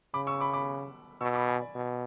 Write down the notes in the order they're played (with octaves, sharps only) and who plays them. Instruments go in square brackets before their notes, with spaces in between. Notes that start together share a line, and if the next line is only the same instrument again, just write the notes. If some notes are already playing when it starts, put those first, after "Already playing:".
[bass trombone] C#3 [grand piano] B5 D6
[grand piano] C#6 E6
B5 D6
B5 D6
[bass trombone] B2 [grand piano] C#6 E6
[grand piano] B5 D6
G#5 B5
D5
[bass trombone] B2